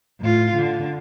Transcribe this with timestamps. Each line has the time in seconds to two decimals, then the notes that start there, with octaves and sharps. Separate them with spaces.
0.21 A2 F4
0.55 D3